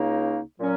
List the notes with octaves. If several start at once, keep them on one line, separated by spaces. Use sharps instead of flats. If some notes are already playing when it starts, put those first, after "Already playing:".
Already playing: C#2 C#3 A#3 D#4
A#2 F#3 C#4